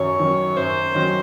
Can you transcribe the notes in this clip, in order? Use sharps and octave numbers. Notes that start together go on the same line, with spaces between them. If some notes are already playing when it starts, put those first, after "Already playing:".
Already playing: F#2 D#3 F#3 C#4 C#5
D#3 F#3 C#4
F#2 C5
D#3 F#3 C#4